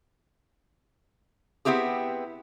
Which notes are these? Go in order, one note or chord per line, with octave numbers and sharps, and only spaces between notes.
B3 C4 E4 G4 G#4